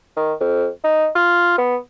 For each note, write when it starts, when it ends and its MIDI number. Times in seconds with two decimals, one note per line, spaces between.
0.17 0.33 51
0.40 0.67 41
0.84 1.08 63
1.16 1.55 65
1.58 1.76 59